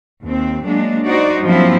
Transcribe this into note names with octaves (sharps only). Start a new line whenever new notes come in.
D#2 C4
F#3 G#3 A#3 D4
D#4 F#4 C5 D5
G2 F3 F#3 A#3 C4 E4